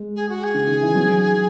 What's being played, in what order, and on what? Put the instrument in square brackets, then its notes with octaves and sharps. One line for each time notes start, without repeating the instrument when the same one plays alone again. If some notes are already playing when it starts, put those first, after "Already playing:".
Already playing: [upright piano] G#3
[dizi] G#4
F#4
G#4
[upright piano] C#3
D#3
E3
F#3